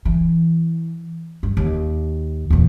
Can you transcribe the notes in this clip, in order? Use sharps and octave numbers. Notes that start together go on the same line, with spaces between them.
E3
G2
D#2
E2 A#2